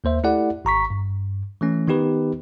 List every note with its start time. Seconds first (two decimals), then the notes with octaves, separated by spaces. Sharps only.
0.04 D#2 A#3 C5 E5
0.24 A3 E4 G4 A4 D5 F#5
0.65 G#1 A#5 C#6 B6
0.90 G2
1.61 E3 A3 C#4
1.88 D#3 B3 D#4 G4 B4